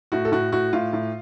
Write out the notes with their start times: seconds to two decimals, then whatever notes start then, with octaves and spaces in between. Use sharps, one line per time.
0.12 A2 F#4
0.25 A4
0.32 A2 F#4
0.52 A2 F#4
0.73 A2 F4
0.93 A2